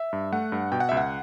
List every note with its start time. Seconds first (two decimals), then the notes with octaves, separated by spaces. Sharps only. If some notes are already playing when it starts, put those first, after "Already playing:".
Already playing: E5
0.13 G2
0.32 A3 F#5
0.52 G2
0.72 B2 G5
0.80 F#5
0.89 C#2 E5
0.97 F#5